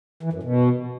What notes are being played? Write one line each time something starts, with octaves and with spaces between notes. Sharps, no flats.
E3
F#2
B2